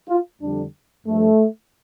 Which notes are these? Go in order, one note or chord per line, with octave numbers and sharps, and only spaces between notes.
F4
F2 D3 G3 D4
G2 F3 A3